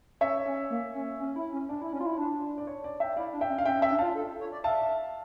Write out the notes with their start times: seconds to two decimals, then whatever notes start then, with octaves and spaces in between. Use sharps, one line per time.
0.21 C#4 C#5 E5
0.46 C#4
0.70 A#3
0.95 C#4
1.19 C#4
1.36 E4
1.53 C#4
1.69 D4 D5
1.82 E4
1.93 C#4
2.01 F4
2.06 E4
2.18 D4
2.58 D5
2.67 C#5
2.84 D5
3.00 E5 G5
3.16 E4 D5 F5
3.33 D4
3.41 E5 G5
3.50 C#4
3.58 F5
3.65 C#4 E5 G5
3.78 C#4
3.82 E5 G5
3.90 D4
3.98 F4 F5 A5
4.15 A4
4.40 C#5
4.52 D5
4.64 E5 F5 A5